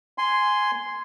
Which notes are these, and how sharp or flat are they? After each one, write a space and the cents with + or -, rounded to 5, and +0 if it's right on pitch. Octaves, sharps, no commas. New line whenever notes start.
G#5 +0 C6 -5